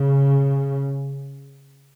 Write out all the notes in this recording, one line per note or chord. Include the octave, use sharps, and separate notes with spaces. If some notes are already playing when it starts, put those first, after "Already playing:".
Already playing: C#3